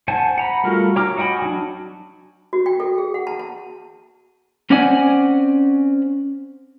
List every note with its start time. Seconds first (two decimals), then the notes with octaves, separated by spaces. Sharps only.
0.08 C5 F#5 G#5 A5
0.38 F#5 A#5 B5
0.64 G3 A3 F4 F#4 A#4
0.96 C#5 G5 A#5 D6 F6
1.17 F#4 D#5 G5 G#5 B5
1.42 F#3 D4
2.53 F#4
2.66 G5
2.80 A4
2.98 G#4
3.14 F#5
3.27 A5
3.39 A5
4.70 C4 C#4 C5 D5 F#5 G#5